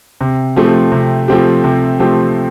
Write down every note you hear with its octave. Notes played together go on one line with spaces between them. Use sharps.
C3
F3 A3 C4 G4
C3
F3 A3 C4 G4
C3
F3 A3 C4 G4